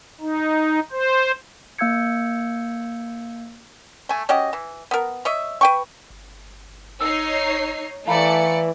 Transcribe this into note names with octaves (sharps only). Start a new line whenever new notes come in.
D#4
C5
A#3 F5 E6 G6 G#6 C#7
A3 G#5
C#4 F#4 G4 D#5
E3
B3 A#4
C#5 D#5 E5
B4 G5 C#6
G1
D#4 C#5 E6 C7
E3 A3 D5 F5 A#5 B5 C#7